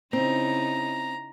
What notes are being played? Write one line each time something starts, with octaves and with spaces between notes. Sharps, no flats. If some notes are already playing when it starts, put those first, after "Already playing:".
C#3 C4 D#4 E4 A#5